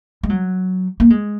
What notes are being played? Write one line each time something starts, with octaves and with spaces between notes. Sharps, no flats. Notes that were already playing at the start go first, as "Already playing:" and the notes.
G#3
F#3
A#3
G#3